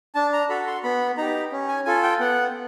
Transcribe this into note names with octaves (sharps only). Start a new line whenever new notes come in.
D4 A5
A#5
F#4 A4 B5
C6
B3 B5
D#4 G4 A#5
C#4
G#5
F4 A4 G#5
G5
B3 F#5